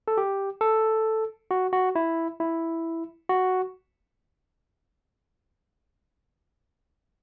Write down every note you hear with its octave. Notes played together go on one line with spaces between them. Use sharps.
A4
G4
A4
F#4
F#4
E4
E4
F#4